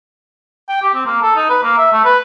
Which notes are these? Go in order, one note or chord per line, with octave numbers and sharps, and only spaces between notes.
G5
G4
C4
A#3
A4
D#4
B4
A#3
E5
A3
B4